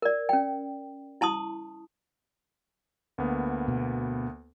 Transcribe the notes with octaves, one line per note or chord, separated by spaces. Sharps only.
A#4 D5
C#4 G5
E4 A5 C6 D#6
D2 A#3 B3
B2